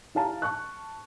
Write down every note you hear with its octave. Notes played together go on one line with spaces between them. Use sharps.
E4 G4 F5 A5 A#5
A5 C#6 F#6